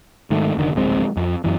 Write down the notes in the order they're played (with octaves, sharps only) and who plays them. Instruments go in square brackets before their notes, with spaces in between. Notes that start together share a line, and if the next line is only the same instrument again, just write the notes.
[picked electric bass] G#2 D#3 A3
F1 D3 D#3
D1 A#1 G#3 C4
F2
F#2 E3